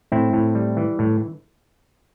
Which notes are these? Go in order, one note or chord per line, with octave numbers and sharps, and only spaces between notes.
A2 C4 E4
A2
G3
E3
A2